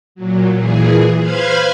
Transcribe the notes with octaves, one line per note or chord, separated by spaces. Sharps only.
A#2 F#3
A#2 E3 G#4
B4 C5 F5 B5 F6 G#6